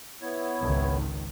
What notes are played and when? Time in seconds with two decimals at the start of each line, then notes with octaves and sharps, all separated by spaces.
0.22 B3 E4 C#5
0.60 G#1 C#2 D#3